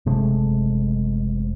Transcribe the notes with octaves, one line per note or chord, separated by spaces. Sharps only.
F#1 C3 G#3 A3